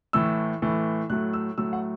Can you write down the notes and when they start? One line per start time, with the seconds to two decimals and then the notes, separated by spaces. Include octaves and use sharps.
0.13 A2 E3 A3 E6
0.62 A2 E3 A3
1.10 A2 F#3 A3 F#6
1.33 E6
1.58 A2 F#3 A3 E6
1.73 F#5